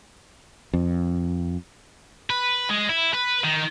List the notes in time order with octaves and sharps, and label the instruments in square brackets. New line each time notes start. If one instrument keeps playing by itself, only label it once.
[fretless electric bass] F2
[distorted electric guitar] B4
G#3
E4
B4
D#3